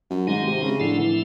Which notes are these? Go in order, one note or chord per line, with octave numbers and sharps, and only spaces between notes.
F#2
G#2 D#3 G#3 C4 D#4
C3
C#3
A2 D3 F3 A3 C4 E4
E3